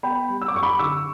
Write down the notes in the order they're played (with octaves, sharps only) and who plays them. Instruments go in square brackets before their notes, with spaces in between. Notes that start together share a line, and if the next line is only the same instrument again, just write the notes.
[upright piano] B3 G5 B5
G3
E6
D6
F#2 C#6
B5 D6
D3 C#6 E6